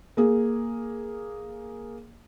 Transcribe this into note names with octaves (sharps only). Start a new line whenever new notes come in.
A#3 G#4